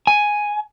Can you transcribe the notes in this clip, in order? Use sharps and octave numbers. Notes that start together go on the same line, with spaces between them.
G#5